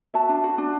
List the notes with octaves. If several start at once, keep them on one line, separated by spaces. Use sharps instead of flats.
F#4 E5 A5
D4
F#4
D4